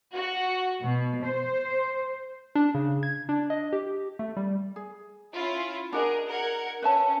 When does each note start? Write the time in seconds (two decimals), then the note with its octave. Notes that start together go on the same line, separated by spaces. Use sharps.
0.14 F#4
0.84 B2
1.23 C5
2.55 D4
2.74 C#3
3.03 G#6
3.29 D4
3.50 D#5
3.73 G4
4.19 A3
4.37 G3
4.76 G#4
5.33 C#4 E4 F4
5.93 D4 F#4 G#4 A#4 D#5
6.27 A#4 F#5 G#6
6.82 C#4 B4 E5 A5